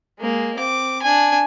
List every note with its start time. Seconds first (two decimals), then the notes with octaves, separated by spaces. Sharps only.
0.19 G#3 A#3
0.56 C4 D6
1.03 D4 G#5